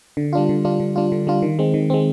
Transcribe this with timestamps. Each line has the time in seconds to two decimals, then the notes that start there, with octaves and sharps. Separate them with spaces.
0.17 D3
0.33 G3 D4 F4
0.49 D3
0.65 G3 D4 F4
0.80 D3
0.96 G3 D4 F4
1.12 D3
1.27 G3 D4 F4
1.42 D#3
1.59 G#3 C4
1.74 D#3
1.90 G#3 C4